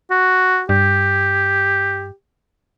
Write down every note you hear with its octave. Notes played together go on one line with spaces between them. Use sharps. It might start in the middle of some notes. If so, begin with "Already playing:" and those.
F#4
G2 G4